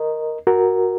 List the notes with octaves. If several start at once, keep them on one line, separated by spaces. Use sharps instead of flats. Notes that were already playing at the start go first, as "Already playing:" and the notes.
Already playing: A#4 D#5
F#4 A#4